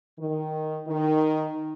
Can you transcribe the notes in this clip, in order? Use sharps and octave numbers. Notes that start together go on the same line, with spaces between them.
D#3
D#3